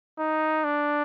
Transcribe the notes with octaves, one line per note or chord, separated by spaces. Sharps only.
D#4
D4